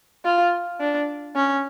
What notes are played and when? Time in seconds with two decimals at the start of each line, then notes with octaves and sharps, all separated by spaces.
0.25 F4
0.80 D4
1.36 C#4